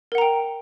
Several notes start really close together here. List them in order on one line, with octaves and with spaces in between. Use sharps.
A#4 F#5 A#5 G5